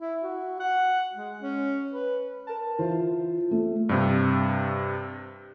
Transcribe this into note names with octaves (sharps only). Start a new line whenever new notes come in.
E4
F#4
F#5
G#3
C#4
B4
A#4 A5
E3 F4 C5
A3
G2 C3